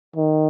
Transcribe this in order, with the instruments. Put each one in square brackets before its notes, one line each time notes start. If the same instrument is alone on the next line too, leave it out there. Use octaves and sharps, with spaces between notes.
[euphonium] D#3